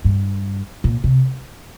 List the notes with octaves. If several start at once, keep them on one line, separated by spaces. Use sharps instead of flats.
G2
A#2
C3